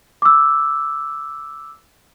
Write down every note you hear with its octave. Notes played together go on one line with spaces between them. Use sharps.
D6 E6